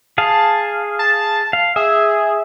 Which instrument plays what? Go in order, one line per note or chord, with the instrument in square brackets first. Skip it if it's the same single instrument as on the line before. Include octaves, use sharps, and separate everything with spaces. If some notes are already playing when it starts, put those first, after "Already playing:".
[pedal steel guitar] G#4 F5 [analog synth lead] A5
[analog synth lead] A5
[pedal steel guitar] F5
[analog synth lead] G#4 [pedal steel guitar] E5